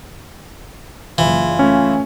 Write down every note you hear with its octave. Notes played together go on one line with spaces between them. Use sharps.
F#1 E3 F4
A3 C#4